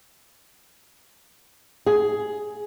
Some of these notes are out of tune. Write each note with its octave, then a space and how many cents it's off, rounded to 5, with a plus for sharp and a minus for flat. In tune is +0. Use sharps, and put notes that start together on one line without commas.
G#4 +10